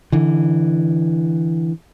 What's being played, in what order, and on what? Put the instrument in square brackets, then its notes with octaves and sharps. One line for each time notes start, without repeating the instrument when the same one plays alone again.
[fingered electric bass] D3 E3